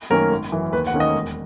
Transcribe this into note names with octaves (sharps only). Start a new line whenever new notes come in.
F#2 D#3 A#3 C#4 A#4
G#1
F#2 E3
D#2 B4
F#5
D#3 A#3 C#4
D#5
E1